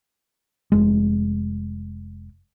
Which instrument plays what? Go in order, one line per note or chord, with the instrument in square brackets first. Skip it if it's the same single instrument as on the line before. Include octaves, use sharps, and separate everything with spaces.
[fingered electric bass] F1 G#3